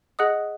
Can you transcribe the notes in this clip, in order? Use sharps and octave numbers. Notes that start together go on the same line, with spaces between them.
G#4 D#5 F#5 D#6 F#6